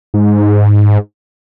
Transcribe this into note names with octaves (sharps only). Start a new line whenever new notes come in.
G#2